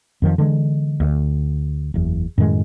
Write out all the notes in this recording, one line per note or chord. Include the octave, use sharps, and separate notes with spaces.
F2 D#3 F3
D3 E3 G#3
D2
F#1 E2
F#2 A2 D#3 G#3